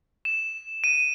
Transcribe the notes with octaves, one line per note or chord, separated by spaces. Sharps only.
E7
D#7